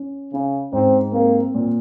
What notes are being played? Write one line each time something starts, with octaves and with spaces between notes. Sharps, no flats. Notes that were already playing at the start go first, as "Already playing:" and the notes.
Already playing: C#4
C#3 C#4
G#2 C4
A#3 C4
A#2